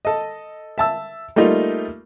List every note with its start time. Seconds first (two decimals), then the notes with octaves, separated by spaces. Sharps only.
0.05 A4 D#5
0.78 E5 A5 E6
1.36 G3 A3 A#3 D#4 F4